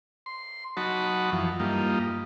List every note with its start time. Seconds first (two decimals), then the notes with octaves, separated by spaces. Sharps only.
0.26 C6
0.77 F#3 D#4 F#4 A5 B5 C#6
1.32 F#2 E3 F3
1.60 G2 G3 A#3 D#4 F4